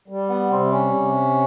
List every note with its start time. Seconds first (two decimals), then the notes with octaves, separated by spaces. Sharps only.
0.08 G3
0.29 B3
0.51 C3 C4
0.72 C#4
0.94 C3